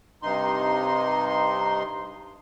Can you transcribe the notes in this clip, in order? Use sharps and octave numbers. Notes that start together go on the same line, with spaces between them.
G2 C3 D#4 C6